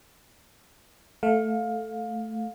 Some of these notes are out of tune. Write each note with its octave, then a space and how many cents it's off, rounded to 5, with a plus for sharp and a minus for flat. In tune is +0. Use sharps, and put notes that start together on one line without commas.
A3 +0 F5 +20